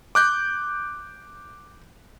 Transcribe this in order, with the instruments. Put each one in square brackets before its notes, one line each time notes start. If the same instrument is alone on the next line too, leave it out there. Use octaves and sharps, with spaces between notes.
[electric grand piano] D6 F#6 G6